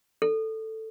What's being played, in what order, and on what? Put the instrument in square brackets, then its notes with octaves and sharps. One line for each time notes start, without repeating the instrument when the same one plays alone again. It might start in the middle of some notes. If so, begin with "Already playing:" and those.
[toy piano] A4